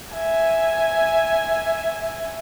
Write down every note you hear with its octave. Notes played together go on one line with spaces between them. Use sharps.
E5 G#5